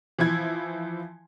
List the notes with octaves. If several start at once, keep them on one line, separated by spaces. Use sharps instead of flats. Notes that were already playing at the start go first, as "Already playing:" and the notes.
E3 F3 E4 G#6